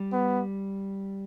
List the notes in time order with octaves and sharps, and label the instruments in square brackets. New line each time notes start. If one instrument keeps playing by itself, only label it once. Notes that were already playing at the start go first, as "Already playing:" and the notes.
Already playing: [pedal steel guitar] G3
[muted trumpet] B3